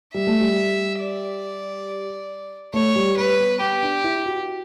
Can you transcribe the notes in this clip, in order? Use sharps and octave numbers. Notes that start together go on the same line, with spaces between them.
G3 E5
A3
G3
D5
A3 C#5
G3
G3 B4
B3
B3 G4
D4
E4
F#4